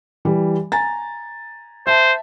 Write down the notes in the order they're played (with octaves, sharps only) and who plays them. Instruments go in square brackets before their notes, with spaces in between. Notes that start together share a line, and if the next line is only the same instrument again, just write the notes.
[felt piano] E3 G3
G#5 A#5 A6
[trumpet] C5 [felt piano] E5 A5